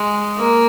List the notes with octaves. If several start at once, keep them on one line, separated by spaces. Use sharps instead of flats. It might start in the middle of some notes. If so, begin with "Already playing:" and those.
Already playing: G#3
A#3